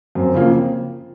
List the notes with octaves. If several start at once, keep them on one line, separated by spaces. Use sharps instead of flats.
F#2 C4
C#3 F3 A#3